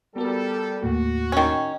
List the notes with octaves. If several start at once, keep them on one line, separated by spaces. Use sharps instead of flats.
G3 B3 F#4 A4 A#4
D#2 A2 A#3 F#4
D#3 C#4